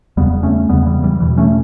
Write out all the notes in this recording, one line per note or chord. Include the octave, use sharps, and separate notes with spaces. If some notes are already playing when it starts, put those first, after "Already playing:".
E2 C#3 G3 B3
A3 C#4
E2 C#3 G3 B3
E3 G3
E3 G3
E2 B2 E3 G3
A3 C#4